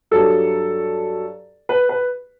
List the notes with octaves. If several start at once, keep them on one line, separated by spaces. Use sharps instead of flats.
G2 F#3 A4
B4
B4